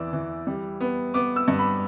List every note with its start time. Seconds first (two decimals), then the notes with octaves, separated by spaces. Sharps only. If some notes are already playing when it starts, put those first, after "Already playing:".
Already playing: E2 E3 B4 D5 E6
0.13 E3
0.47 G3
0.81 B3
1.14 B3 D6
1.36 E6
1.48 G2
1.59 B5